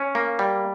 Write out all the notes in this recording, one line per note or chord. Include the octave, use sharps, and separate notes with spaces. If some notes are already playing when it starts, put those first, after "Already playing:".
Already playing: C#4
A#3
G3